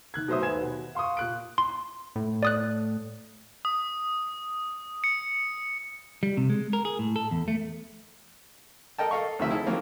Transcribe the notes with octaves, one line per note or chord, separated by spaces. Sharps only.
D#3 F#6 G#6
B2 F#3 A3 C5 E5 D#6
D#2 B4 G#5 G#6 E7
B2
F5 C6 C#6 D#6
A#2 F#6 D7
C6
A2
D5 D#6 F#6
D#6
C#7
G3
C3
G#3
A#4
G#4
A2
A4
E2
A3
A4 A#4 D#5 G5 A5
A4 D#5 F5 C#6
D2 C3 D#3 F3 E5
E4 G#4 A4
D#3 F3 F#3 A#3 C4